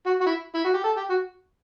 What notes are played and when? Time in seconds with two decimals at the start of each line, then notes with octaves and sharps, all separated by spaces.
0.06 F#4
0.21 F#4
0.26 E4
0.55 E4
0.65 F#4
0.74 G4
0.84 A4
0.97 G4
1.10 F#4